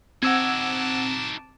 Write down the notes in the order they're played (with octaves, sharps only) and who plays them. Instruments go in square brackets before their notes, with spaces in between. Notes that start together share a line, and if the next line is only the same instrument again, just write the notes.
[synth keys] C4 [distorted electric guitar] D#4 F#4 [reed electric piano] F#5 E6 G#6 [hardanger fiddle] A5 D6